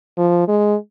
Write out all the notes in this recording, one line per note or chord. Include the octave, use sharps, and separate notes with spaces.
F3
G#3